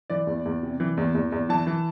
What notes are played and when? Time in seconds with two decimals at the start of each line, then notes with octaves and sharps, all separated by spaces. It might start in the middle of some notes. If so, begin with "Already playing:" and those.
0.10 E3 D5
0.27 E2
0.45 E2
0.63 C3
0.80 E3
0.97 E2
1.15 E2
1.32 E2
1.49 E3 A5
1.67 E3